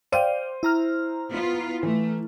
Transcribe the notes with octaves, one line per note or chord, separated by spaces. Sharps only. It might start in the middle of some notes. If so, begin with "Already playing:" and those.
C5 D5 F5 G5 D#7
E4 A#5 F6
B3 F4
E3 A3